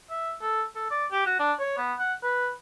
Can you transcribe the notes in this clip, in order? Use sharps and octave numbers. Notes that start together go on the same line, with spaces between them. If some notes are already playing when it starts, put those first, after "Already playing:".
E5
A4
A4
D5
G4
F#4
D4
C#5
B3
F#5
B4